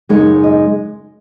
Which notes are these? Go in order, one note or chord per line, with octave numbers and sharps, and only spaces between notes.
F#2 C#3 G#3 D#4 C#5
D#5